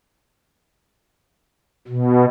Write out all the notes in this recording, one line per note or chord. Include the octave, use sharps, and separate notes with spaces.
B2